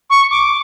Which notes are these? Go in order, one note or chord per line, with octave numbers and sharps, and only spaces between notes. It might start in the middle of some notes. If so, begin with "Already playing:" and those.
C#6
D6